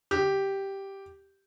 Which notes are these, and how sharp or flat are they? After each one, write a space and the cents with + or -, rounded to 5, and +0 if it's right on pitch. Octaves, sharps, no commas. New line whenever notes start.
G4 -5